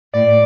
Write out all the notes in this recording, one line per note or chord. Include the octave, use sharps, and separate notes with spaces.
A2 D5